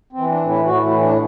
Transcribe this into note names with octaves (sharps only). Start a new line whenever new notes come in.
C4
E3
D4
A2
E4
A2 F#4
E4
E3
D4